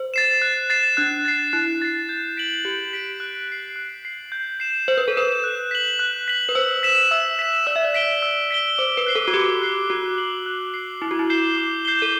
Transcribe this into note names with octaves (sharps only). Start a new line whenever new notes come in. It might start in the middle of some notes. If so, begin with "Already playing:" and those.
Already playing: C5
A6 C7 E7
F#6
A6 C7 E7
D4 F#6
A6 C7
E4 F#6
A6 C7
G6
B6 D7 F#7
G4 G6
B6 D7 F#7
F#6
C7 F#7
F#6
C7 F#7
G6
C7 E7
C5 G6
B4
A4
B4 C7 E7
F#6
B6 F#7
F#6
B6 F#7
B4
C5 E6
B6 E7
E5 E6
B6 E7
D5 E6
E5
D5
B6 D7 G7
E6
B6 D7 G7
C5 D6
B4
F#6 C7 G7
A4
F#4
G4 D6
F#6 C7 G7
F#4 F#6
C7 F#7
F#6
C7 F#7
E4 D6
F#4
E4
G6 C7 E7 G7
D6
G6 C7 E7 G7
A4